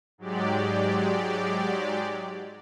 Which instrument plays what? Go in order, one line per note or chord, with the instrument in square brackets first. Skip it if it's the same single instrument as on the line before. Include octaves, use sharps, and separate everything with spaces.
[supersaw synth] G#2 F#3 G#3 G4 D5